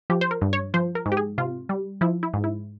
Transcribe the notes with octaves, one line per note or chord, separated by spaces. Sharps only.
F3 G4
C5
A#4
G2
C#5
F3 C5
A#4
G#2
G4
G#4
C3 F4
G3
F3 E4
E4
G#2
E4